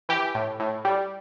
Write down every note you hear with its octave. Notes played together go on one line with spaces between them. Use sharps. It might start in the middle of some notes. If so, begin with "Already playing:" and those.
E3 G4
A2
A2
G3